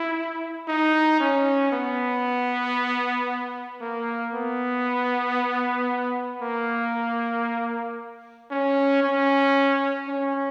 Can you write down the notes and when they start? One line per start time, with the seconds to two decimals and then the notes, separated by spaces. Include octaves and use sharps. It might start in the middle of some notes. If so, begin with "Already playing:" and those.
Already playing: E4
0.68 D#4
1.20 C#4
1.72 B3
3.81 A#3
4.34 B3
6.42 A#3
8.51 C#4
9.03 C#4
10.08 C#4